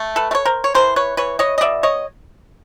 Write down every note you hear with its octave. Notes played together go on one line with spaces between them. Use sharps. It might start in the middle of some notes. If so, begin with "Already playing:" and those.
Already playing: A3
A4 B4
A3
C#5
A#4 C5
C#5
E3 A#4 C5
B4 C#5
E3 B4 C#5
C#5 D#5
D#5
B2 D5 E5
C#5 D#5